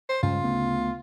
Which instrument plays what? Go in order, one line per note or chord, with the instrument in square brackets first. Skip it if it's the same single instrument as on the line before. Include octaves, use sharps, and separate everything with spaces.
[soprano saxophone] C5
[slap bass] G2 G#3 [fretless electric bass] C#3 [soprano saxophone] F4
[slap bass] D2 A3 B3